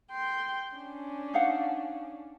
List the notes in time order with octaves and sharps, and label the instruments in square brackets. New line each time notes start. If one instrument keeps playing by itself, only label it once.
[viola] G5 C6
C#4 D4
[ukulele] D#4 F5 F#5